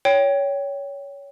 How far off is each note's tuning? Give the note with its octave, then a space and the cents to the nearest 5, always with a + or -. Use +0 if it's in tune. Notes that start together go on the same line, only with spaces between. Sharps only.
C#5 +20 G5 +0